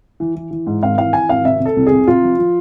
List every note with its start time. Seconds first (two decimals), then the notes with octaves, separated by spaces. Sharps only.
0.20 E3
0.35 E3
0.51 E3
0.66 G#2
0.82 G#1 F5
0.98 E3 F5
1.13 E3 G#5
1.29 G#1 F5
1.45 C3 E5
1.60 C3
1.65 A4
1.76 C2
1.87 G#4
1.92 C3
2.07 C3 F4
2.23 F3
2.39 F3